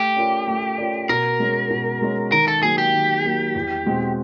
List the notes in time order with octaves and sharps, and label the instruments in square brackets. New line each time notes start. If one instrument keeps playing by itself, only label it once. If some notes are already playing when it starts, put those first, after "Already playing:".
Already playing: [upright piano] A3 [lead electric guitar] G4
[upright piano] C#4 F4 A#4 D5
A3
C#4 F4 A#4 D5
[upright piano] B2 [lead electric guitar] A#4
[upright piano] G#3 C#4
B2
G#3 C#4
[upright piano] D#3 [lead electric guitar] A#4
[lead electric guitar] A4
[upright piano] F#3 A#3 [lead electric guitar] G#4
[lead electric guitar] G4
[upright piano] D#3
F#3 A#3
E2
B2 G#3 C4